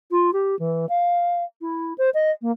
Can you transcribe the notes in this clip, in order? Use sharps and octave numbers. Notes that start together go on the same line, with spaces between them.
F4
G4
E3
F5
E4
C5
D#5
A#3